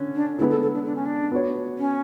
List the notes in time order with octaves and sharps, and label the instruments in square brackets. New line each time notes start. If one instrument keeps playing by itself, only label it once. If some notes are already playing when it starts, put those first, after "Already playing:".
Already playing: [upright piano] D3 C#4
[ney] D4
[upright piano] D3 G#3 B3 [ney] E4
[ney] A4
A4
D4
D4
C#4
D4
[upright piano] B3 F#4 C#5
[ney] C#4